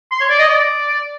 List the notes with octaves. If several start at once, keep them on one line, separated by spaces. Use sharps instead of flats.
C6
C#5
D5
D#5
D5